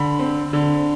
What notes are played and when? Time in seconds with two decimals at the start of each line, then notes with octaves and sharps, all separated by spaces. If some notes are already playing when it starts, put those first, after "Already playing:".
Already playing: D3 B5
0.19 C4
0.53 D3